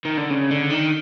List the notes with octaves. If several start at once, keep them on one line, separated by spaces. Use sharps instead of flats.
D#3
D3
C#3
D3
D#3